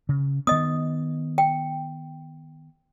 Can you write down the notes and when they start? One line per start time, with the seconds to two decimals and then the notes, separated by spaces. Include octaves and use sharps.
0.09 C#3
0.47 D#3 B3 D#5 D#6
1.38 G5